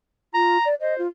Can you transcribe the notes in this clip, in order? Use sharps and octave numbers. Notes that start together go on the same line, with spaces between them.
F4 A#5
D5
C5 D#5
F4